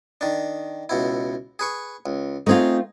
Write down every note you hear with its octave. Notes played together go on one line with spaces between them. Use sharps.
D#3 D4
C#2 B2 E4
G#4 B4 C#6
C#2
A3 C4 D#4 F4 G#4